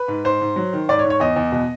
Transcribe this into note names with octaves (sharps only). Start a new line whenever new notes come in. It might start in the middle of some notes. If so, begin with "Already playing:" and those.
Already playing: B4
G#2
G#2 C5
G#2
F#3
D#3
G#2 D5
C#5
G#2
C#5
E2 D#5
E2
B2